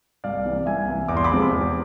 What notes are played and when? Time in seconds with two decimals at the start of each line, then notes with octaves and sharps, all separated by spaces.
0.24 C2 D5 F5
0.45 C3 E3
0.66 C2 E5 G#5
0.87 C3 E3
1.08 E2 D6
1.17 C6
1.24 B5 D6
1.31 C3 F3 G#3
1.51 E2